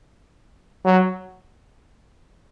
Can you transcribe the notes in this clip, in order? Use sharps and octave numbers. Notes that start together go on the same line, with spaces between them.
F#3